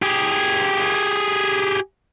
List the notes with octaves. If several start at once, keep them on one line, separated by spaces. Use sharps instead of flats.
G4 G#4